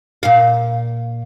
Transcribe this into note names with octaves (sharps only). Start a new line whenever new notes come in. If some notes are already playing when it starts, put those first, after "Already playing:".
A#2 F5